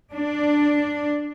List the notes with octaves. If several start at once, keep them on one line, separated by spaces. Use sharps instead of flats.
D4